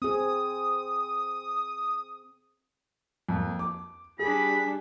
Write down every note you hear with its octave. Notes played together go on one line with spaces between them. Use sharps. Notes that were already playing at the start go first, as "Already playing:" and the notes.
C4 G#4 D#6
F2 A#3
D6
G3 D4 G#4 B5